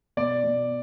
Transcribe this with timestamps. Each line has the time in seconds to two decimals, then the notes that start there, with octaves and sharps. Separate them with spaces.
0.17 B2 D5
0.44 B2